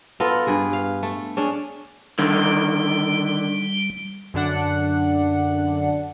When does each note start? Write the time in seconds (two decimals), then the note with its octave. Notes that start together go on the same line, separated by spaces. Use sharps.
0.20 B3 F4 A4 A#4
0.47 G2 G#4 B4
0.73 F5
1.03 A3
1.37 C#4 D4 G#4
2.19 D3 D#3 G3
4.34 F#2 D3 D4 F#5